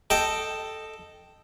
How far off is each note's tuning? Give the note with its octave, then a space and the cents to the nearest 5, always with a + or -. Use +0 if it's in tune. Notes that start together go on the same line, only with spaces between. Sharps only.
A4 +0 D#5 -10 G5 +0